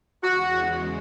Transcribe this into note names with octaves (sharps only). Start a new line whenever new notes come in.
E2 C#3 E3 G#3 F#4